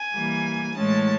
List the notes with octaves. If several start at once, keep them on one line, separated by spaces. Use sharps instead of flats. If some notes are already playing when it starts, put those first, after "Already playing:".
Already playing: G#5
E3 G3 A#3
A2 E3 G#3 C#4 A5